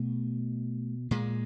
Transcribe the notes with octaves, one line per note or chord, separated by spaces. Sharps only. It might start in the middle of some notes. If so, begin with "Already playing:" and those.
Already playing: B2 A3
A#2 G#3